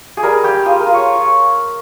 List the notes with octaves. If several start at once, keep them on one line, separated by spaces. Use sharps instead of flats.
G#4
G3 A#4
G3 G4
F4 G#4
A#4
F4
C#5